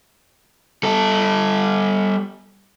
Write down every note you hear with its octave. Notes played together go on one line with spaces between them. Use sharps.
G3 A4